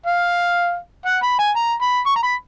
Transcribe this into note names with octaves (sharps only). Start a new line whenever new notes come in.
F5
F#5
B5
G#5
A#5
B5
C#6
A#5
B5